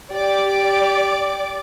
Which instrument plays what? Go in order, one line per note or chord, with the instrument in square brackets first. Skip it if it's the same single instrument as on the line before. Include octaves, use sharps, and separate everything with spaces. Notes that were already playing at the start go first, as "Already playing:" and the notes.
[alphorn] G4 [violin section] D5 D6